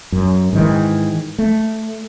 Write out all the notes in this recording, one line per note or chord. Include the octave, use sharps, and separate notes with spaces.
F#2
G#2 D#3 E3
A3